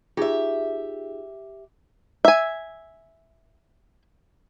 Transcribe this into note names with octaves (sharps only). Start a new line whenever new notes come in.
D#4 F4 G4 G#4 E5
E5 G#5